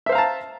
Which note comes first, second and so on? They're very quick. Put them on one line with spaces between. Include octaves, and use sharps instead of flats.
E5 C5 F5 A#5 A5